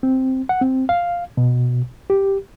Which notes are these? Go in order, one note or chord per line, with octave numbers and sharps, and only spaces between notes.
C4
F#5
C4
F5
B2
G4